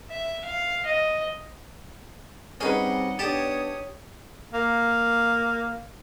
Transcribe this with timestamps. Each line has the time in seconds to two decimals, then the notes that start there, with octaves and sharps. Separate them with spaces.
0.10 E5
0.45 F5
0.86 D#5
2.61 G3 C4 C#4 D#4 G#4 B4 D#5 F#5
3.19 B3 D4 G4 C#5 A5 D#6
4.53 A#3